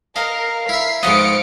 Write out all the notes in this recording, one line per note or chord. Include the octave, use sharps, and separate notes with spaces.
A#4 D#5 F5
E4 E5 B6 C7
G#2 F3 B3 F5 D#6 C#7 D7